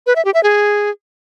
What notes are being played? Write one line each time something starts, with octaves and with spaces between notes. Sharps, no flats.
B4
E5
G4
E5
G#4